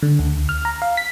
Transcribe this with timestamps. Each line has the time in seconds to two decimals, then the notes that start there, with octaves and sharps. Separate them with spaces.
0.02 D3
0.19 D2
0.49 F6
0.65 A#5
0.82 F5
0.97 B6